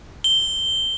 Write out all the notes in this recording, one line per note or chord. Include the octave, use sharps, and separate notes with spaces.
G7